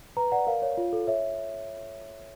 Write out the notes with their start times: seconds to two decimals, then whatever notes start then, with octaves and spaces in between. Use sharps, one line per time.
0.17 B4 A#5
0.32 D5 F#5
0.47 A#4 F5
0.62 C#5
0.77 F4
0.93 A4
1.07 C#5 E5